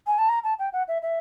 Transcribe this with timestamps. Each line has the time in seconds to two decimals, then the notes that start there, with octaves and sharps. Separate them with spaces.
0.07 G#5
0.18 A5
0.29 A#5
0.44 A5
0.59 G5
0.73 F#5
0.88 E5
1.02 E5